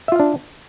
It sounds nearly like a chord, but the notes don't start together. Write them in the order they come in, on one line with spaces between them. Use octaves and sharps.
E5 F4 F5 D4